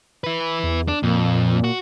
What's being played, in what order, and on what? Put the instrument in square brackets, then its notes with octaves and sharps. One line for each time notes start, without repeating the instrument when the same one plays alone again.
[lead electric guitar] E4 B4
[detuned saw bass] E2
[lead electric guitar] D4
[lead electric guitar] F2 [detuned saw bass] A#2
[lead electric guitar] F#4